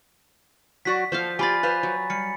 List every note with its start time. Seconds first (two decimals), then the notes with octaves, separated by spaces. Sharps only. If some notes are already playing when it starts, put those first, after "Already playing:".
0.85 F#3 F#4 D5 B6
1.12 F3 A4 C5 F5
1.39 F4 G4 D5 G#5 B5 A6
1.63 B4 C5 F5
1.83 F#3
2.10 G3 C#7